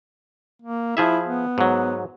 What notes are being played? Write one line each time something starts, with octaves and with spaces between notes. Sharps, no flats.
A#3
F3 E4 G#4 E5
B3
G#2 F#3